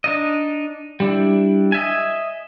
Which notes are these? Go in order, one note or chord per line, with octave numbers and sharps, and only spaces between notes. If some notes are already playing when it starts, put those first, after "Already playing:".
D4 D#4 D#5
G3 D4 E4
D#5 E5 G#5